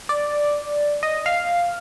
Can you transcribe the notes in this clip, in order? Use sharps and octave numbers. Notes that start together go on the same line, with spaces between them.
D5
D#5
F5